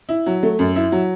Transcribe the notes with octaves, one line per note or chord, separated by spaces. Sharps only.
E4
F#3
A3
F#2
E4
F#3